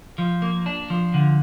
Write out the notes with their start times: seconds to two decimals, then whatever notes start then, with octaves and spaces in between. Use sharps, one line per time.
0.18 F3
0.42 A#3
0.66 D4
0.90 F3
1.14 D3